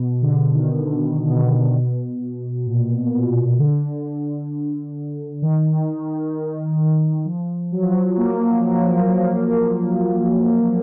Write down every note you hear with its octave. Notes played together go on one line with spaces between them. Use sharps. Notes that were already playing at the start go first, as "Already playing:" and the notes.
Already playing: B2
D3
D#3
D3
B2
B2
A#2
A#2
B2
D3
D#3
F3
F#3
F3
F#3
A#3